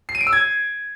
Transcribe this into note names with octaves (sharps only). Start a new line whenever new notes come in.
C7
D#7
D7
E6
G#6